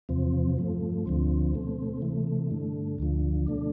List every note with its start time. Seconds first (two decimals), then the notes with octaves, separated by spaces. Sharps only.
0.09 E2 C3 F3 C4
0.58 G2 F3 A3
1.06 D2 D3 F3 C4
1.54 B2 A3 C4
2.02 C3 E3 A3
2.51 G2 D3 A3
2.98 D2 D3 F3
3.47 B2 A3 D4